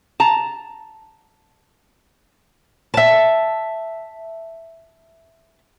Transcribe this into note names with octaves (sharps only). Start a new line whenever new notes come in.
A5 A#5
E5 A5